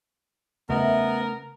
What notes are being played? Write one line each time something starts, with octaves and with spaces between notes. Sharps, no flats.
C#3 A3 B3 A#4 D#5 E5